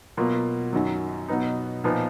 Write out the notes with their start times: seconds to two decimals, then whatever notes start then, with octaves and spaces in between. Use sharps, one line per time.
0.17 B2 F#3 A#3 F4
0.73 F#2 D#3 F#3
1.28 B2 F#3 B3 D#4
1.84 A#2 F3 B3 D#4